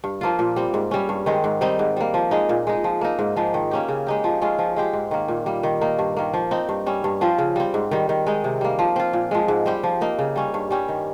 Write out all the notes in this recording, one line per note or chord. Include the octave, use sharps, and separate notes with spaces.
G2
F3 A#3 F4
A#2
G3 C4
G#2
G3 C#4
G2
D#3 G#3 C4
G#2
G3 C4 D#4
G#2
G3 A#3
F3
G#3 D#4
A#2
G#3 D#4
F3
A#3 D#4
G#2
F3 G#3 D#4
D#3
A#3 C#4 G4
C#3
G#3 D#4 G4
F3
G#3 C#4 F4
F3
G#3 C4 G4
G#2
D#3 A#3
A#2
G3 A#3
D#3
A#3 D#4
G2
D#3 A#3
F3
C4 D#4
G2
G3 C#4
G2
F3 C4 F4
C#3
G3 C4
G#2
D#3 G3
D#3
G#3 D#4
C3
G3 A#3
F3
C4 F4
A#2
F3 G#3
G#2
G3 C4 G4
F3
A#3 D#4
C#3
G3 C#4
G2
G3 C#4 G4
D#3